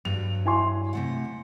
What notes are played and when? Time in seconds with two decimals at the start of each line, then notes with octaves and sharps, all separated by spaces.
0.05 G2 F#3 F7
0.45 E4 G#5 C6
0.93 C3 A3 F#5